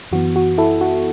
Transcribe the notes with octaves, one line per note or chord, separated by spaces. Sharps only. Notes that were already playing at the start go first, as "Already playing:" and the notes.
F#2 E3 B3 F#4
F#4
E4 A4
F#4